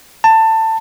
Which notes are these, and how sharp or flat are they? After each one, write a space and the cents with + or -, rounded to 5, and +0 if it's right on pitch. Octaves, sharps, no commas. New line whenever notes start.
A5 +20